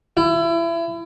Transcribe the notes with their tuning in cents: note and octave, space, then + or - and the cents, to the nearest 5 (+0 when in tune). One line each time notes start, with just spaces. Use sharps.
E4 +30